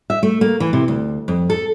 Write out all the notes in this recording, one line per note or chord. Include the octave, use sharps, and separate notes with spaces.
E5
A3
A#3
E3
C3
D2
F2
A4